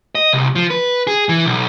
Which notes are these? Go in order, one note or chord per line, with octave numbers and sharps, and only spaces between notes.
D#5
C2
F3
B4
G#4
E3
B1